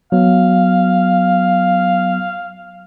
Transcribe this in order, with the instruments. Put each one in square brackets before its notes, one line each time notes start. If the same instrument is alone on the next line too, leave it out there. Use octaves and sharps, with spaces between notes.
[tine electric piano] F#3 B3 [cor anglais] F5